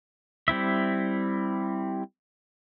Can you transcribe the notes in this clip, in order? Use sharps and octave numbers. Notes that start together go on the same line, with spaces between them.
G3 C4 E4 E5